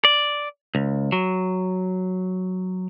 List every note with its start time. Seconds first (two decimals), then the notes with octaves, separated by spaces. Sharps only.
0.05 D5
0.75 C#2
1.12 F#3